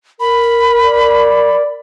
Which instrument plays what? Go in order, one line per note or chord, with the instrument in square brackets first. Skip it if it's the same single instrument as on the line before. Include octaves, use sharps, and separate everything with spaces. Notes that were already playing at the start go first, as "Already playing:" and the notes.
[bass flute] A#4 [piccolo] B5
[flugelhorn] D5